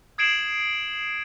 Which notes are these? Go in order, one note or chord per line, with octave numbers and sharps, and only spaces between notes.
D#6 G#6 C7 D7 E7 F#7